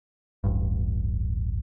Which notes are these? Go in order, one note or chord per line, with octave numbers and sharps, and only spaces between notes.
D1 A1 G2